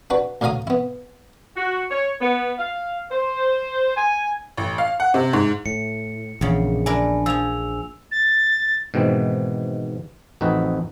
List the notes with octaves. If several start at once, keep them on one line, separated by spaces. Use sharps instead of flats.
D4 F#4 B4
D2 A2 F#3 F5 A#5 D#6
B3 E4
F#4
C#5
B3
F5
C5
G#5
A1
F5
F#5
C3
G#2
A2 C#7
A#1 E2 C#3
D4 E4 A#4 G#5
F3 G#4 E6 F7
A6
G#2 B2 D#3 E3 C4
A1 F2 C4 D#4 F#4 B4